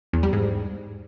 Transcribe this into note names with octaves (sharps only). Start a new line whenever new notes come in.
E2
G3
G#2